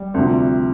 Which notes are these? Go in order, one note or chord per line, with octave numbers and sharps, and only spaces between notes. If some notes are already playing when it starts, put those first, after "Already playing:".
Already playing: G3
D2 C3 F3